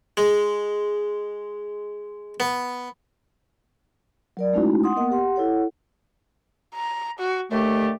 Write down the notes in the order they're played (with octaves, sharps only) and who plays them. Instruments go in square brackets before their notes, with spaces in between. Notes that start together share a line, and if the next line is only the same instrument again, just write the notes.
[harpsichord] G#3
B3
[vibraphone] F#3 A#4 D5
G#3 A3 C#4 D#4 E4 F#4
F#5 C6 D#6
A#3 B3 A#4 D#5 F#5
G4 F#5 C6
E4 A4 C#5 F#5
[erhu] A#5
F#4
[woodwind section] D#2 D3 A3 [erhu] G4